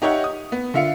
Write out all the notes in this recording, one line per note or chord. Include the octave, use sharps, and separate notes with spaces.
D#4 G4 C#5 E5 F#5
D#6
B3
D3 F4 E5 F5 C#7